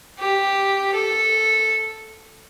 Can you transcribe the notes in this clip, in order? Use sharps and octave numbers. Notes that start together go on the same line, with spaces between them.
G4
A4